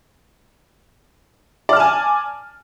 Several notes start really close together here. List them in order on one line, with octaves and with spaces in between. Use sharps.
D5 F6 A5 G#5